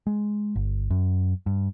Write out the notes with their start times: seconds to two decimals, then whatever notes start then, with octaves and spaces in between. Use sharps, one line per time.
0.07 G#3
0.56 G1
0.90 F#2
1.46 G2